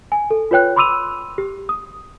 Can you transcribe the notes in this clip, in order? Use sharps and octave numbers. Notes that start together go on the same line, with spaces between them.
G#5
A4
F4 B4 C#5 G5 F#6
B5 C6 D6 E6 D#7 F7
G4
D#6